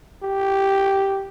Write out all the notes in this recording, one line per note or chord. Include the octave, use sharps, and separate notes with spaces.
G4